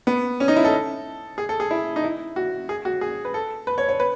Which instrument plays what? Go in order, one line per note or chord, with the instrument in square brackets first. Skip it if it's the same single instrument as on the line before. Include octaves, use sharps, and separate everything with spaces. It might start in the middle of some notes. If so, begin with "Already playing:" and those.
[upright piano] B3
C#4
D#4
E4
A4
G#4
A4
G#4
E4
D#4
E4
F#4
G#4
F#4
G#4
B4
A4
B4
C#5
C#5
B4